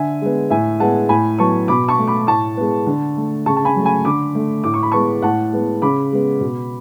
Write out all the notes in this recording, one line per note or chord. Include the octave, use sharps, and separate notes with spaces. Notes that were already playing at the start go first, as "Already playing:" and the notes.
Already playing: D3 E5 G#5
G#3 B3
A2 E5 G#5
G#3 B3 F#5 A5
A2 G#5 B5
F#3 B3 A5 C#6
B2 B5 D6
A5 C#6
A3
B5 D6
A2 A5 C#6
G#3 B3
D3
A3
C#3 A5 C#6
A5
G#5 B5
F#3 A3
G#5 B5
D3 B5 D6
A3
A2 D6
C#6
B5
G#3 B3 A5 C#6
A2 F#5 A5
G#3 B3
C#3 B5 D6
G#3 B3
B2